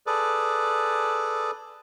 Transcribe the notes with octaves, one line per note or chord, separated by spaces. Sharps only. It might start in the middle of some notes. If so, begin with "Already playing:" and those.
G#4 A4 B4 D5